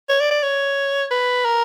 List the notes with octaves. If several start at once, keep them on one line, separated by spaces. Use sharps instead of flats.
C#5
D5
D5
C#5
B4
A#4